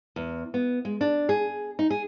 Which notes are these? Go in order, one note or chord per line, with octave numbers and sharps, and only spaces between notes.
E2
B3
G#3
D4
G#4
D#4
G#4